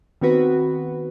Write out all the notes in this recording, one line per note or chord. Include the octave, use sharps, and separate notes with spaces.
D#3 B3 C4 F#4 B4